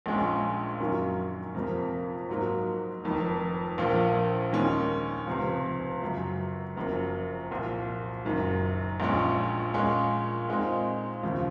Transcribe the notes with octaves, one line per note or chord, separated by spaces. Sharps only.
A#1 A#2 G#3 C#4
F#2 D#3 F#3 A#3 C#4
F2 C3 F3 A#3
G#2 F#3 A#3
F1 F2 D#3
A#1 A#2 F3 A#3
D#2 D#3 G#3 C#4
C#2 C3 F3
F#2 C#3 F#3
F#1 F#2 F3 A#3
C2 A#2 F3 A#3
F#1 F#2 D#3
A#1 A#2 G#3 C#4
A#2 G#3 C#4
A#2 G#3 C4 D#4
D#2 C#3 F3